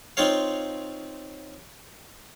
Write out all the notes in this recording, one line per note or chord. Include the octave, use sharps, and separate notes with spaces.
C4 D#4 F4 C#5 F5